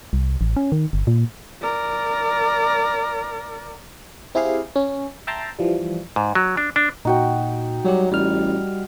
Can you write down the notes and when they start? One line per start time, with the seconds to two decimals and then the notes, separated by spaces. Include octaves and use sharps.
0.13 C2
0.41 A1
0.56 C#4
0.72 D#3
0.93 G1
1.07 A#2
1.62 A#4 D5
4.35 C4 E4 G4 G#4 F5
4.76 C#4
5.27 E5 G5 A5 A#5 C6
5.59 E3 F3 G3
6.16 G#2
6.35 F#3
6.57 D4
6.76 D4
7.05 A#2 D#4 F#4 G5
7.85 F#3 G3 G4
8.12 A1 G3 F6